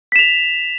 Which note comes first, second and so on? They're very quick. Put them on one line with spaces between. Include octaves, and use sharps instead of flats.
B6 E7 F7